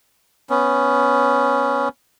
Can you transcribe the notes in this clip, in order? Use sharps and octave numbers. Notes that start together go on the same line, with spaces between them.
B3 C#4